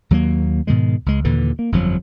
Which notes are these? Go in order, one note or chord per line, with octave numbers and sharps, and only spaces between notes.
D#2 F#3 G3 A#3
G#2 B2 D#3 G#3
C#2 G#3
D#2 A#2 D3 E3
A#3
G1 F2 F3 F#3